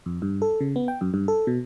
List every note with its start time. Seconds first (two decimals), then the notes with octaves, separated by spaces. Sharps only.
0.06 F2
0.22 G2
0.42 A4
0.60 C#3
0.76 B3
0.88 G5
1.01 F#2
1.14 G2
1.28 A4
1.47 B2